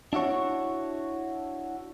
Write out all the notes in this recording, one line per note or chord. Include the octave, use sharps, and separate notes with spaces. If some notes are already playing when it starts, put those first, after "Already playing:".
D4 E4 F#4 C#5